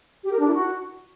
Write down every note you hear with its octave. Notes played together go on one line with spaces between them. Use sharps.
G4
A#4
D4
E4
F#4